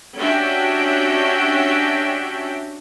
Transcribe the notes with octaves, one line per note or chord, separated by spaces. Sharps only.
C#4 D4 F#4 G4 E5 G5